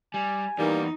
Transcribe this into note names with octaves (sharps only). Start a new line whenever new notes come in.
G3 G#5
E2 E3 G3 A#3 D#4